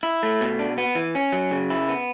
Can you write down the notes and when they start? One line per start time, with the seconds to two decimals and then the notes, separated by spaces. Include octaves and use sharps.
0.03 E4
0.23 A3
0.41 B2
0.59 D4
0.78 B3
0.95 E3
1.15 C#4
1.33 F#3
1.51 C#3
1.70 E4
1.89 B3